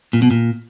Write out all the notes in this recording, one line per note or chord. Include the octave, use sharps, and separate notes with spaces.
A#2
B2
A#2